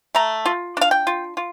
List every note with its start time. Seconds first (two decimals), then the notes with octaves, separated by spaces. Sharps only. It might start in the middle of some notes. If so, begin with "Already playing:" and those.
0.15 A3 A#5
0.46 F4
0.77 D4 F5
0.91 G5
1.07 F4
1.37 F4